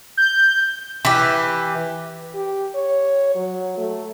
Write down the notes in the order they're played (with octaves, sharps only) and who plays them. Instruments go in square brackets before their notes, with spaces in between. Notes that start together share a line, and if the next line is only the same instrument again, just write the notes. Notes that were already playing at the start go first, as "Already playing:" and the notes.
[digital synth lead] G6
[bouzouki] E3 G4
[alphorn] G4
C#5
F#3
A3